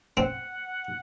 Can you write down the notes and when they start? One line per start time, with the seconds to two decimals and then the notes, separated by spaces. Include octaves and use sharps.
0.17 C4 F#5